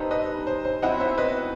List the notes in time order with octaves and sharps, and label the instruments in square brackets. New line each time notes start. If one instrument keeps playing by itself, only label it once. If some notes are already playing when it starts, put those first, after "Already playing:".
Already playing: [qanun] G3 D#4 A4 [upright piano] B4 C5 D#5
[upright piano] B4 D#5
C5
C5
[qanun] F#3 C4 E4 [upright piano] D#5 F#5
[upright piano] C5 E5
B4 D#5